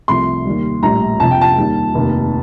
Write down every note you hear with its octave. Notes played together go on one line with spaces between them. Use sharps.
C2 C3 F3 A3 C6
D#2 D#3 G3
A#1 A2 G3 A#5
F2 C3 F3 A5
G5
A5
D#2 D#3 G3
F1 D#2 D#3